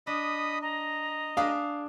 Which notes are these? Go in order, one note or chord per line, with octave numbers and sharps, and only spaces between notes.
D4 D#5 B5 D#6
D#5 A#5
D4 G#4 F5 B5